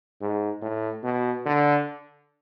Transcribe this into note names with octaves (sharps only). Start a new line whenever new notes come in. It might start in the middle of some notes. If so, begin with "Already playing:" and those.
G#2
A2
B2
D3